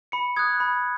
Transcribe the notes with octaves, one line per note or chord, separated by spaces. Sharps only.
B5 C#7
D#6 F#6 G#6
B5